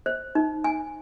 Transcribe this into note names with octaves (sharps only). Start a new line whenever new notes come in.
C5
D#4
G#5